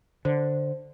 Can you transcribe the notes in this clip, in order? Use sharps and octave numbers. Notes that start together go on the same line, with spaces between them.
D3 C5